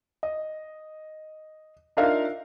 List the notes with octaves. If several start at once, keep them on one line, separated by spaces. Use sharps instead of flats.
D#5
D4 D#4 F4 A#4 E5 F5